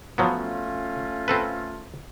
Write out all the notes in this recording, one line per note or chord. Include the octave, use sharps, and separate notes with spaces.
F3 F#3 A3 B3 C#4 F4
C4 A4 B4